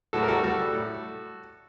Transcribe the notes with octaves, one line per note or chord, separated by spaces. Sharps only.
A2 F#4 A4
A#4
G3 F#4 A4
G3 F#4 A4
G3
A2